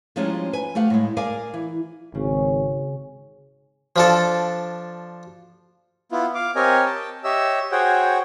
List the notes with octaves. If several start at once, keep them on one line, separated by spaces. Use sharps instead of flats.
F3 G3 G#3 C#4 D#4 F4
B4 G#5
A3 G4 F5 F#5
A2 G#3
G#4 A#4 D5 F5 G#5
E3
G#1 C#3
F3 D4 A4
B3 E4 F4
F5 D6
C4 G4 A#4 C#5 D#5 G#5
G5 A5
G4 C#5 D#5 E5 E6
F#4 G#4 C5 C#5 F#5 G5